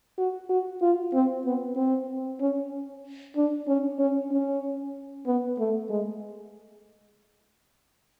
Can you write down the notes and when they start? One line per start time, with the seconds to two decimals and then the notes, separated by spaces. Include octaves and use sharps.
0.18 F#4
0.49 F#4
0.82 F4
1.13 C4
1.45 B3
1.76 C4
2.41 C#4
3.36 D4
3.68 C#4
3.99 C#4
4.31 C#4
5.26 B3
5.59 A3
5.90 G#3